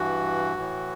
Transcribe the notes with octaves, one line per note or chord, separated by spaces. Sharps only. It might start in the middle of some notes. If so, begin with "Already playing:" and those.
Already playing: G2 E3 F#4
A2 E3